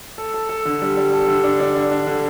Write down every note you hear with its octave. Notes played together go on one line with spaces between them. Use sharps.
A4
A4
A4
D3
G3
G3
A4
D3
D4
D4
D3
D4
D3